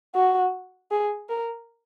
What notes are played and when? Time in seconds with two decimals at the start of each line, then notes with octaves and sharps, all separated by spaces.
0.15 F#4
0.91 G#4
1.29 A#4